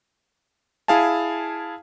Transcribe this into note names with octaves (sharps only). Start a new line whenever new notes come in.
E4 G#4 F5 G#5 A5